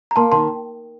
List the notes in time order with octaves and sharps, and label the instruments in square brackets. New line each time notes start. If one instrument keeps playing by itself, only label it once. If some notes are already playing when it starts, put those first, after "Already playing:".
[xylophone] A#5
[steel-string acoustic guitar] A#3 [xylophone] A5 C6
[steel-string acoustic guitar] D#3 [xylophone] A5 C6